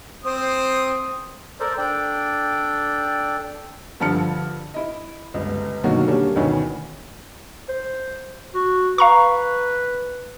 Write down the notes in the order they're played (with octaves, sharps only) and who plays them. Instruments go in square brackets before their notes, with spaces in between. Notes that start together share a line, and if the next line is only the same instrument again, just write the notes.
[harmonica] C4 C5 D#6
[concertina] A4 A#4 C5 D5
D4 A4 D5 G5
[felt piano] G2 D3 F3 A5 F6 C#7
E4 D#5
G1 C#2
B2 D3 D#3 F#3 A#3 F#4
G3 A3 A#3 C#4 D4
D2 B2 D#3 E3 C#4
[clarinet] C5
F#4
[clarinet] B4 [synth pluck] F5 A#5 C#6